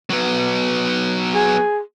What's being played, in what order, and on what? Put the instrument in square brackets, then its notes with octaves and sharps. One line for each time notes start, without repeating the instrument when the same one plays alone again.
[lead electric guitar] F#3 B3
[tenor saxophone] G#4